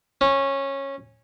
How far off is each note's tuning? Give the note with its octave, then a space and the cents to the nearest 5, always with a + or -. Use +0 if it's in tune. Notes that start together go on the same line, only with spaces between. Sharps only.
C#4 -15